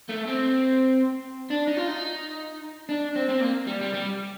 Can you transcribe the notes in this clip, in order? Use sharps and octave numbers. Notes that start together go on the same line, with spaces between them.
A3
C4
D4
D#4
F4
D#4
D4
C4
C4
A#3
G3
G3
G3